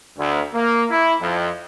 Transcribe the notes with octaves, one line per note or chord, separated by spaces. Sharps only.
D2
A#3
E4
F2